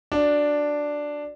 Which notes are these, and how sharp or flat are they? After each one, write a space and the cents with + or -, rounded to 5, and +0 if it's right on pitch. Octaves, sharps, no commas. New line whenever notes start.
D4 +0 F#4 +0